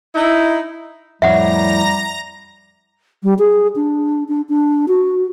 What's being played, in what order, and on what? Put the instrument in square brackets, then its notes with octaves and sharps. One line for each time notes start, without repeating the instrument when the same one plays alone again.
[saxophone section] D#4 E4
[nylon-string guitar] F2 A2 C#5 [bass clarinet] G3 [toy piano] E5 F#5 [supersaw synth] A#5 A#6
[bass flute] G3
G#4
D4
D4
D4
F#4